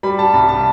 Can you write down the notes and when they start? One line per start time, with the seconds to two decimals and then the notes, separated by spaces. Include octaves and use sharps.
0.03 G3 B5
0.19 A5
0.34 C2 B5
0.49 A5